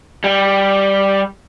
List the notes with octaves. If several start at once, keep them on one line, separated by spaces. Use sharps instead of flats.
G3